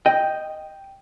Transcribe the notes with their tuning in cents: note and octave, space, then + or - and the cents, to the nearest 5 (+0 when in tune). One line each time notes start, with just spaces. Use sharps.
D#5 +0 G5 +0